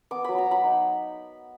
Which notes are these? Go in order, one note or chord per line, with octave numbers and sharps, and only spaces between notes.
B3 D6
F#3 B5
A#5
F#3
B5
D#4